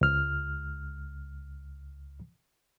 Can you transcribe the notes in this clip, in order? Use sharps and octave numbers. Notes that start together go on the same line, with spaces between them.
C#2 F6